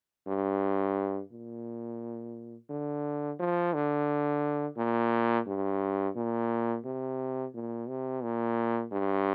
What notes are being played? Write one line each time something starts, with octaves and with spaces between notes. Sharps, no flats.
G2
A#2
D3
F3
D3
A#2
G2
A#2
C3
A#2
C3
A#2
G2